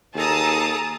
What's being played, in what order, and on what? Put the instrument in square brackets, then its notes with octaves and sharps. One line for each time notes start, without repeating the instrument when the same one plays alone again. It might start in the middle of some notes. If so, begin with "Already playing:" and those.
[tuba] D#2 [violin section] G#4 A#5 D#6 [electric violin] A4 A5